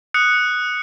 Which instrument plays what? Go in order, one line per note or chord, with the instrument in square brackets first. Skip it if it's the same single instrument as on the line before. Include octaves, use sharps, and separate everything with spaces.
[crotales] D#6 F#6 C#7